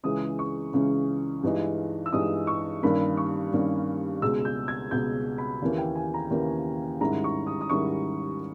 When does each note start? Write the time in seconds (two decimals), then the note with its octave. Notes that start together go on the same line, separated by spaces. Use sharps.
0.03 C#2 C#3 E3 G#3 C#4 D#6
0.39 C#6
0.73 C#2 C#3 E3 G#3 C#4
1.43 G2 E3 G#3 D#4
2.06 E6
2.12 G2 E3 G#3 D#4 D#6
2.47 C#6
2.82 G2 D#3 G3 A#3 C#4 B5
3.17 C#6
3.53 G2 D#3 G3 A#3 C#4
4.21 C#2 B2 G#3 E6
4.45 G6
4.68 G#6
4.91 C#2 B2 G#3 G6
5.38 B5
5.62 D#2 C#3 E3 A#3 C#4
5.78 G5
5.95 G#5
6.14 A#5
6.31 D#2 C#3 E3 A#3 C#4
7.00 G#2 D#3 G3 C#4 E4 A#5
7.24 C#6
7.47 D#6
7.61 D#6
7.70 G#2 D#3 G3 C#4 E4 C#6